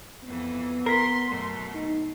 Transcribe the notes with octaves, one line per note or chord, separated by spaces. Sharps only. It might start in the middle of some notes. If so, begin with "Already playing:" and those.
F2 E3 B3
A#4 C6 B6 C7
F#2 B2 A3
D#4